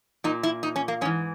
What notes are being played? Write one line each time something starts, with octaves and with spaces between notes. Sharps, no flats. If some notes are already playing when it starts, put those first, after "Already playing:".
A#2 D#4
E4
D#4
C#4
A#3
G#2 E3 C#4